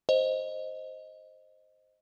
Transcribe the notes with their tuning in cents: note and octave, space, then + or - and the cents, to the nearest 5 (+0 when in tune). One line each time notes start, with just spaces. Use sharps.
C5 +0 D#5 +0